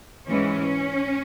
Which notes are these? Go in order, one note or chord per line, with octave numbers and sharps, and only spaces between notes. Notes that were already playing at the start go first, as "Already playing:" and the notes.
G#2 E3 G#3 C#4